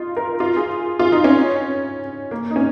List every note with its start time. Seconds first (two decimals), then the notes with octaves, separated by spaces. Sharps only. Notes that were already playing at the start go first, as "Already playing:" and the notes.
Already playing: D#4 F4
0.17 A#4
0.40 F4
0.57 G#4
0.99 F4
1.12 D#4
1.24 C#4
2.31 A#3
2.51 D#4
2.56 C#4